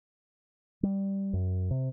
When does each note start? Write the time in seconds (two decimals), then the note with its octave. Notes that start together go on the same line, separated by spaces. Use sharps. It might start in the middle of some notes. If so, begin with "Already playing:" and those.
0.83 G3
1.33 F#2
1.71 C3